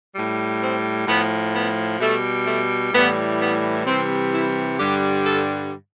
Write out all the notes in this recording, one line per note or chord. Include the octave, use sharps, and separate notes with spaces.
A2 G3
C4
A2 F3 B3
B3
B2 G3 A3
A3
A2 E3 G3 B3
B3
C3 E3 G3 C4
E4
G2 D3 G3 G4
A4